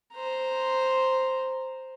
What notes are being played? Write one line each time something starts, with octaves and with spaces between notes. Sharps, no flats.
C5 A#5